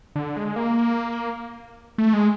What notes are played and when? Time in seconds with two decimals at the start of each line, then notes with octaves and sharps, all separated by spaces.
0.16 D3
0.37 G#3
0.56 A#3
1.98 A3
2.13 G#3